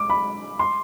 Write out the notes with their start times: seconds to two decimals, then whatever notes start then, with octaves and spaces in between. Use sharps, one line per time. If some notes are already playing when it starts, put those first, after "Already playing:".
Already playing: D6
0.10 B5
0.59 C6